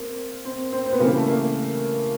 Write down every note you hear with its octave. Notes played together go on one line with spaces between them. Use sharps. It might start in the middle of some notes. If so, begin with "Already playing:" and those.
Already playing: A#3 C4
C4
C4
C4
B3
C#3 E3 G3 A#3
A3
A#3